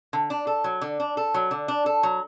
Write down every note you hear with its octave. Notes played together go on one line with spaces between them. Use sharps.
D3
D4
A4
F#3
D3
D4
A4
F#3
D3
D4
A4
F#3